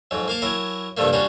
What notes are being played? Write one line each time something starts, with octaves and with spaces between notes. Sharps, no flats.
F2 G#2 F#3
A#3 F5 A5
F#3 E4 A#4 G#5 A5
C2 G2 F3 G3 A3 A#3
G3 C#4 D4 F4 F#4